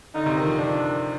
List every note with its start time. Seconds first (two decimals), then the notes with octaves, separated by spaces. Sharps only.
0.15 D3 D#4
0.26 C3
0.37 D#3
0.47 F3
0.58 D#3 D4